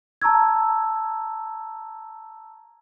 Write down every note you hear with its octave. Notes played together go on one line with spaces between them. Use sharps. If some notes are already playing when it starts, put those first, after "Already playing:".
A5 A#5 C#6 E6 G#6